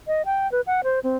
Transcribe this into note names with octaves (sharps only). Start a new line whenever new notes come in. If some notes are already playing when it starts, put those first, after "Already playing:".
D#5
G5
B4
F#5
C5
C4